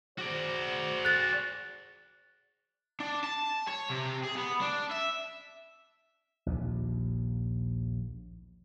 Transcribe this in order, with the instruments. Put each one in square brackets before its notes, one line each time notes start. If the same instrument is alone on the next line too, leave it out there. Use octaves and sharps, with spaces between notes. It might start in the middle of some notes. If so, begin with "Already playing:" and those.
[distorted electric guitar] F#4 D5 [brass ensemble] G#4 C5
[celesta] F#6 A6
[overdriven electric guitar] D4
A5
C#5
C3
G#4
B3
D4
E5
[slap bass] A#1 D#2